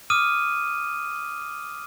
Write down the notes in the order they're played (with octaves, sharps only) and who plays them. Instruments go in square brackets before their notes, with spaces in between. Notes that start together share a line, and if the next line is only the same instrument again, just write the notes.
[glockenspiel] D6 D#6 F6 D#7